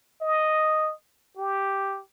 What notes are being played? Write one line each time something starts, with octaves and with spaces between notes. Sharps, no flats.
D#5
G4